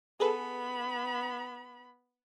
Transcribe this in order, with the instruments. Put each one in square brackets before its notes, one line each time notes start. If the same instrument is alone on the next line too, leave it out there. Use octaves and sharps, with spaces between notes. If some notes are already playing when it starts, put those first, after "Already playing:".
[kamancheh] B3 B5 [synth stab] G#4 A4 B4